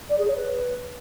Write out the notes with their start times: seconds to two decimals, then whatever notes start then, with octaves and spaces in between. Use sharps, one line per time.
0.09 D5
0.18 G#4
0.27 C#5
0.35 B4